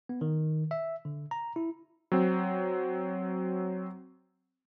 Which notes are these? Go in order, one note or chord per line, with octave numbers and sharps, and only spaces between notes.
B3
D#3
E5
D3
A#5
E4
F#3 C4